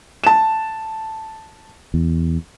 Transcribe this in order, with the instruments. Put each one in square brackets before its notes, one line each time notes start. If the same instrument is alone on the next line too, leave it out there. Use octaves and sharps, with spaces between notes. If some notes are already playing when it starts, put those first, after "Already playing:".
[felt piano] A5 E7
[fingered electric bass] E2